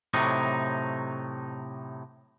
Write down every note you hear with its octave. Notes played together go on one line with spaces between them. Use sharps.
A2 C3 F#3 D#4